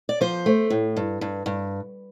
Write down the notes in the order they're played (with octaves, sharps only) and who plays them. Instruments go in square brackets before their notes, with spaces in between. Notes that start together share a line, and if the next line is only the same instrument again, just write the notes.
[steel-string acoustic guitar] D5
F3 C5
A3
A2
G2
G2
G2